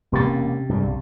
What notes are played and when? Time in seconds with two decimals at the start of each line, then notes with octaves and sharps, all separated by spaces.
0.12 E1 C3 A#3 C#4 G4 A6
0.69 G2 C#3 G3
0.83 B1